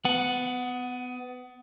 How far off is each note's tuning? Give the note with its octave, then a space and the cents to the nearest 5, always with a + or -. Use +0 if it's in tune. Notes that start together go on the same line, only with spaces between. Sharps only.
B3 +25 F#5 +0